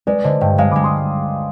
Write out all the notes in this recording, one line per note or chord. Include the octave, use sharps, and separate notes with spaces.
G#3 B4 D5
D3 C5 D#5
G2 D#5 G5
G#3 F5 G#5
G#3 B5 D6
C6 D#6